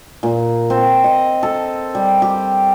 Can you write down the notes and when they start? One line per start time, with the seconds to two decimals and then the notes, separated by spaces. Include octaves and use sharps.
0.23 A#2
0.70 C4
1.04 D#5
1.43 A4
1.95 G3
2.22 G4